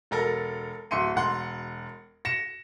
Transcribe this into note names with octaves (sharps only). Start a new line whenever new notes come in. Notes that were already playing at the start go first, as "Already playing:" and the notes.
E1 A4 A#4 A#5
D1 E5 C6 C#7 D#7
E1 F#5 C6
A#6 C#7 E7